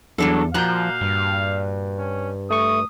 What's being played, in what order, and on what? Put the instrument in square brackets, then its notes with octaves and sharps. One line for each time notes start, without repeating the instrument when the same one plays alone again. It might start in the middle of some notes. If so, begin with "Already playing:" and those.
[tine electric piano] E2 [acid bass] F#3 [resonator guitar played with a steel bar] G3 D4 A4
[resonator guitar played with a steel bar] A#2 F#4 A#5 [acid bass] F3 [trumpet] F5 [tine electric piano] F#6 G6
[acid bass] G2
[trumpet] C#4
[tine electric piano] A3 C#6 [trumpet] D#6